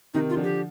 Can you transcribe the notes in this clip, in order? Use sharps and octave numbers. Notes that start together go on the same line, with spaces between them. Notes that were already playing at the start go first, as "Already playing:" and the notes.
C3 D#3 D#4
F4
D3 F3
G4